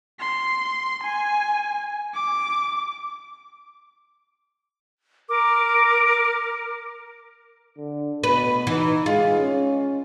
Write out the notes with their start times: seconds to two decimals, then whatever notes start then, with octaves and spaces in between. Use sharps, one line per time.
0.20 C6
1.03 G#5
2.14 D6
5.29 A#4 D6
7.78 D3
8.24 B2 B4
8.67 E3 D#4
9.06 G#3 F4
9.39 C#4